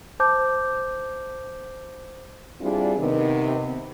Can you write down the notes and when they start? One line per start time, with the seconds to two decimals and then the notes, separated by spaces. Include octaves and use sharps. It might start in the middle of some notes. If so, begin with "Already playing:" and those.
0.20 C5 A5 D6 G6
2.61 G3 C4 D4 E4 F4 G#4
2.99 C3 D#3 B3